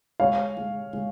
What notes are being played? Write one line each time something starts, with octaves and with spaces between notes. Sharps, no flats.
G#3 C#5 F5
G#3
G#3